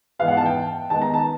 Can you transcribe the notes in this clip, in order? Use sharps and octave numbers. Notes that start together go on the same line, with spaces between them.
G#2 E3 G#3 B3 F5
F#5
A5
G5
D#3 G#3 B3 D#4 A5
A#5
A5